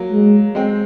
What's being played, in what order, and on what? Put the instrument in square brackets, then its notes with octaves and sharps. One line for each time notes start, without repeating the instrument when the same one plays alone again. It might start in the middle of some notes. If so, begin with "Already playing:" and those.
Already playing: [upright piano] F#3 A#3
[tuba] G#3
[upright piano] G#3 C4